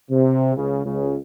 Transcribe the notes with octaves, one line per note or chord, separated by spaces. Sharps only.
C3
C#2 C#3
C#2 C#3